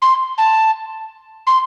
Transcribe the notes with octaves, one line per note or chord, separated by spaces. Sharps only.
C6
A5
C6